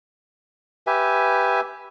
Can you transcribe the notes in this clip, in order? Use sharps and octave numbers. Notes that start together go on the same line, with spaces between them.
G4 B4 E5 G#5